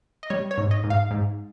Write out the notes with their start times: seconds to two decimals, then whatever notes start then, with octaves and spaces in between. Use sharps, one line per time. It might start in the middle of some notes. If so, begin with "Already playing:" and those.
0.23 D#5
0.30 G3 C#5
0.51 C#5
0.58 G#2
0.71 D#5
0.84 G#2
0.90 F5
1.11 G#2